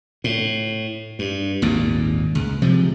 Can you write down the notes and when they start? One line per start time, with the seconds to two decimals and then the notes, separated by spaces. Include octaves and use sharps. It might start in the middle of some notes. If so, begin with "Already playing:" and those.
0.24 A2
1.19 G2
1.62 G#1 D#2 A#2
2.35 C#2
2.62 C3 F3 G#3